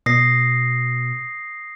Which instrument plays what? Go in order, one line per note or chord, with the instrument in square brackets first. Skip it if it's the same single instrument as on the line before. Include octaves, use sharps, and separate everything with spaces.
[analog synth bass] B2 [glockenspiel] D#6 A#6 C7